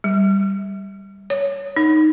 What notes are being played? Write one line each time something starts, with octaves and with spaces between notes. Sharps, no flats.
G3
C#5
D#4